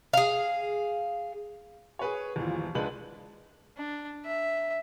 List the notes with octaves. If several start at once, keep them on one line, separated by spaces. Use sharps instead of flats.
G#4 F5
G#4 B4 C#5
G1 D#2 A#2 E3 F3
C#2 G#3 D4 B4 F#7
D4
E5